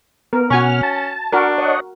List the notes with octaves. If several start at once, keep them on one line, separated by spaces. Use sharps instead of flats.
B3 A#4
B2 C#4 F#4 G#5 C#6 F6
A5
D4 F#4 A#4
C#5 D#5 F#5